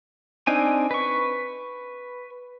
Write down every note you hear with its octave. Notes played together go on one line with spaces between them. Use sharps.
C4 D4 D#4 G#5
B4 C#6